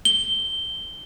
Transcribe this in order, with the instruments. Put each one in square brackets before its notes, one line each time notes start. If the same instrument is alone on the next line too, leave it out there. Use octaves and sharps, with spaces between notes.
[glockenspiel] G7